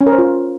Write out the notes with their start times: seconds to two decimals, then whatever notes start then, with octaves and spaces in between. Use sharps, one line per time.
0.01 C#4
0.06 A#4
0.12 C5
0.18 F4